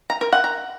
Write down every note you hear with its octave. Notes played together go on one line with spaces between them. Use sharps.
A#5
A#4
F#5
A#5